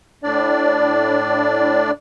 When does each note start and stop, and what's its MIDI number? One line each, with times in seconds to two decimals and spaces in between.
0.24 1.91 45
0.24 1.91 62
0.24 1.91 74